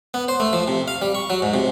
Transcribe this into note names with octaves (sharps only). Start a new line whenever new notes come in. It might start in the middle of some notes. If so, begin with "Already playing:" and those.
B3
C5
A3
F3
C3
F5
G3
C#6
F#3
G#2
C3